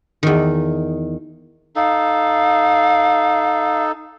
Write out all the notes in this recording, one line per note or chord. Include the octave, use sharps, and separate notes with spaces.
E2 D#3
D#4 A4 F5